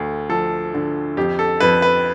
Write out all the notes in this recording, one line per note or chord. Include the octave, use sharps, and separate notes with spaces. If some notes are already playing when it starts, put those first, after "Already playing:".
Already playing: D2 A3
F3 A4
D3
F2 G4
A4
F2 B4
B4